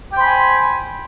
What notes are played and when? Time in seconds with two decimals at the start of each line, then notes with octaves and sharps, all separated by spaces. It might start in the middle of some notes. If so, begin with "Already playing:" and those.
0.13 G5
0.16 C5
0.20 B5
0.23 G#5